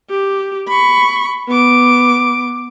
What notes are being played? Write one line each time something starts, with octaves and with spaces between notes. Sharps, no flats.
G4
B5 C#6
B3 D6